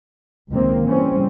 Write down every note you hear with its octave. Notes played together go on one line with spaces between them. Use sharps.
C#2 C3 D#3 A#3 C4
C#3 E3 G3 C4 C#4